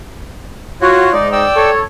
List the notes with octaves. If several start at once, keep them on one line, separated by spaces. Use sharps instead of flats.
F4 F#4 C#5
G#2 G#3 D#4 D5
D5 G5 E6
A4 C#5